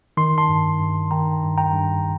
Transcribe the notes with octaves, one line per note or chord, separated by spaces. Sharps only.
D#3 C6
A5 C6
G2
G2
D#3 G5 A#5
G2
G5 A#5
G2